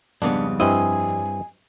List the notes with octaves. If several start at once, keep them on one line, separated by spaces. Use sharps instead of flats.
F2 G#2 C#3 G3 B3 D4
G2 C4 E4 D#5 G#5